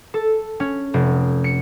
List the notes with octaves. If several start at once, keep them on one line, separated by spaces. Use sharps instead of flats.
A4
C#4
F1
C#7